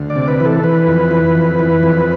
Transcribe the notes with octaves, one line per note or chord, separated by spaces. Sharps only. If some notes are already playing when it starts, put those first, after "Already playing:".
Already playing: D2
D5
C3
B4
E3
A4
E3 B4
F2
E3
F2
E3
F2